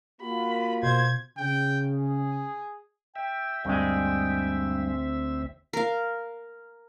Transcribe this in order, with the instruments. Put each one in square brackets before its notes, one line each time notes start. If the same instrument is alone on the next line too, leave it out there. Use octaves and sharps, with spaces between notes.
[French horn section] A#3 F4 F#4 [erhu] B5
[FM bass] B2 [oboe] C5 [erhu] G#6
[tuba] C#3 [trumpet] G5
[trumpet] G#4
[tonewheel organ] E5 [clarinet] G5
[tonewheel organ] D2 C4 E5 [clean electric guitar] G2 G#3
[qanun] A#4 F5